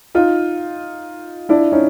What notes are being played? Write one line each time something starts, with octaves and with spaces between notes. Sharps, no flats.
D#4 F4
D4 E4
C#4 D#4